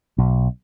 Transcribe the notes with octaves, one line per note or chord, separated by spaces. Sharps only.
B1